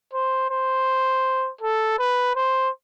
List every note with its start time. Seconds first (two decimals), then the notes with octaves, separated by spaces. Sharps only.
0.14 C5
0.51 C5
1.61 A4
1.99 B4
2.36 C5